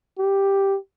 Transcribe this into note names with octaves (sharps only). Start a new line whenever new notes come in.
G4